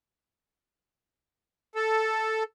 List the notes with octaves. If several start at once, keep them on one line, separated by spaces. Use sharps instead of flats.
A4